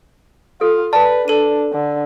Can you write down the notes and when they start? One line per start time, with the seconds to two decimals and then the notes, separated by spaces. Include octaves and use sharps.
0.61 F4 A4
0.93 B4 D5 A5
1.28 D4 A4 D#7
1.73 D3